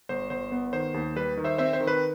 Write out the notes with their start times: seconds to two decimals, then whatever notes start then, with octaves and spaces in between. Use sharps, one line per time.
0.09 G1 C5
0.30 G1 C5
0.52 B3
0.73 D#3 C5
0.94 D#2
1.16 G3 B4
1.37 D#3
1.44 C5 E5
1.58 C4 C5 E5
1.73 C5
1.80 D#3
1.87 B4